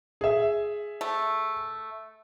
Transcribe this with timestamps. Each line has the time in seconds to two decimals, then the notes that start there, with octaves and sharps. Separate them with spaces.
0.21 G#4 E5
1.01 A3